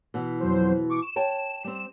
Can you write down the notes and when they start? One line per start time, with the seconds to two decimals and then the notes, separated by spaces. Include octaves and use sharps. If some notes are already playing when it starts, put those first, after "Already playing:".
0.14 B2 E3
0.40 F2 F#3 C5
0.89 C#6 D6
1.02 E7
1.16 C#5 G5 A5
1.64 G3 C4